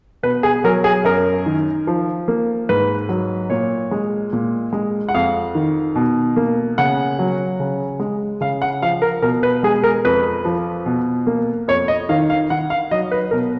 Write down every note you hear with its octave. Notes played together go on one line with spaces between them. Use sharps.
B2 B4
G#4
F#3 A#4
G#4
F#2 A#4
D#3
F3
A#3
G#2 B4
F#3
A#2 C#5
G#3
A#2
G#3
F#5
F2 F5
D#3
B2
A#3
C#3 F#5
F#3
C#3
G#3
C#3 F5
F#5
F3 F5
A#4
B2 A#4
B4
G#3 G#4
A#4
F2 B4
F3
B2
A#3
F2 C#5
D#5
D#3 F5
F5
D#3 F#5
F5
F#3 D#5
B4
B2 A#4